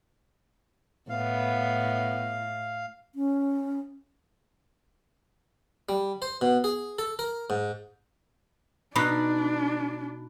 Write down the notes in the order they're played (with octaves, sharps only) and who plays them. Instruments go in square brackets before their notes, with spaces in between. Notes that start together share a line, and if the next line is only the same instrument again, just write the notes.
[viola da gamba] A2 [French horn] B3 [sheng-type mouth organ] F5
[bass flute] C#4
[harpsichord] G3
C5
B2
G#4
A4
A#4
G#2
[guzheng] B2 D#4 [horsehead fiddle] D4 [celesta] B5 F#6